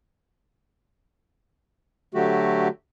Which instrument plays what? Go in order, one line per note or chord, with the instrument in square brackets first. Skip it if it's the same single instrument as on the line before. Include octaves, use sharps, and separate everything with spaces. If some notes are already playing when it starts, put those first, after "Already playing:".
[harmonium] D3 F#3 A3 F#4 G4